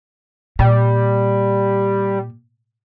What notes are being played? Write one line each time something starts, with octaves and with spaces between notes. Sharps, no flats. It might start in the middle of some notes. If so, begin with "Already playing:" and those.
A#2 G3